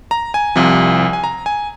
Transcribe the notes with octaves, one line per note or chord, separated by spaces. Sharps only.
A#5
G#5
C2 C3 F3
G#5
A#5
G#5